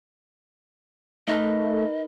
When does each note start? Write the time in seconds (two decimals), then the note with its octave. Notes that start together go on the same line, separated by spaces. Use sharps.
1.28 A3 D#4 A#4 B4 D#5